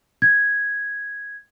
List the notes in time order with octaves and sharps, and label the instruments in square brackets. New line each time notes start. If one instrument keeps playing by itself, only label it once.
[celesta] G#6